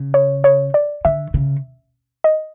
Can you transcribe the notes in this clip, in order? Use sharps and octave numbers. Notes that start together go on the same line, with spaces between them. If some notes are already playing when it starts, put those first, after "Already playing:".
Already playing: C#3
C#5
C#5
D5
D3 E5
C#3
D#5